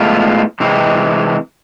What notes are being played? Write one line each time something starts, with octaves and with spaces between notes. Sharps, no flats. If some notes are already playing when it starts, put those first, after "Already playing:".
Already playing: A2 G#3 B3 F4
C3 E3 G#3 C4